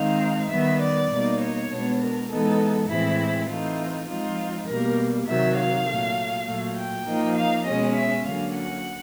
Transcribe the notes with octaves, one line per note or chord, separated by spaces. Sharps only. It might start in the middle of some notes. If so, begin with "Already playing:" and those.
Already playing: D#3 G#3 C4 D#4 F5
D#3 G3 B3 E5
D5
B2 G3 A#3 D#4
C#5
B2 G#3 B3 D4
A#4
E3 G#3 B3 D#4 A4
A2 E3 G#3 C4 E4
E3 A3 C4 D#4 F4
F3 G#3 C4 D#4 F4
B2 G3 A#3 A#4
C3 D#3 F#3 E5
F5
A#2 F#3 A3
A#2 F#3 A3
G5
F3 A#3 D#4
F5
B2 G#3 C#4 D#5
E5
D3 F#3 A#3 C#4 F5
F#5